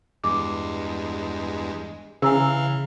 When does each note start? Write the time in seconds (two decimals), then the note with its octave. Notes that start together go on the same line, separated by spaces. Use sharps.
0.24 E2 G2 G#3 D6
2.22 C#3 E3 F5 G#5 A#5 E6